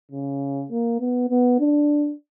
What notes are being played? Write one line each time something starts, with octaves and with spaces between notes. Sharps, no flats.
C#3
A#3
B3
B3
D4